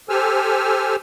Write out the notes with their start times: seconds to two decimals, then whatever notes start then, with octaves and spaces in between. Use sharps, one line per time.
0.09 G4 A4 C5 G#5 E6 F6